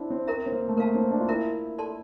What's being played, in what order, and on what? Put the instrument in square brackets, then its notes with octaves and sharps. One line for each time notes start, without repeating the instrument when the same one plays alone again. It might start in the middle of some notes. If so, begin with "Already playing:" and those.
Already playing: [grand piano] C4 D4 E4
C4
[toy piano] A#4 E5 A#5
[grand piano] C4
A#3
A3
[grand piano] A#3 [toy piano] A#4 F5 A5
[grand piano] C4
D4
F4
[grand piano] E4 [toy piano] A#4 E5 A#5
[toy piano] A4 D5 A5 C6